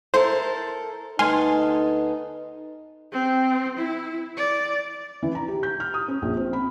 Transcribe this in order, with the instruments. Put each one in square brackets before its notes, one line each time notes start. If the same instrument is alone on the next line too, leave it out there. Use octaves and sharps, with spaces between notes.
[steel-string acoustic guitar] E4 A4 A#4 [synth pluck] C5
[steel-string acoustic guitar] D2 B3 A4 [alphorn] D#4 [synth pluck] G#5 C6 F6
[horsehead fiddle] C4
E4
D5
[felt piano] E3
A#5
G4
G6
F6
D#6
C#4
A#1
C4
B5